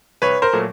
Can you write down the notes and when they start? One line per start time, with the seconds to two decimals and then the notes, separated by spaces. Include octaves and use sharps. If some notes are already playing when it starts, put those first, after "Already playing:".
0.22 C2 B4 C#5
0.42 A#4 C5
0.53 A#2 F#3 A3